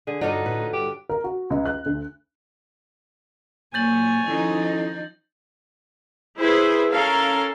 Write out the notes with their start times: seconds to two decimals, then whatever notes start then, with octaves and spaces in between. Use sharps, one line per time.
0.07 D3 G#4
0.21 G2 D4 D#4 F4 F#4 A4 C#5
0.46 A2 B4
0.73 G2 G4
1.09 A#4
1.24 F#4
1.50 C#2
1.66 F#6
1.86 D2
3.74 A#2 F#3 C#5 G#5 G6 A6 F#7
4.26 D#3 F3 C#4 D#4 E4 A4
6.38 E4 G#4 B4 C5
6.90 C#4 A4 A#4 F5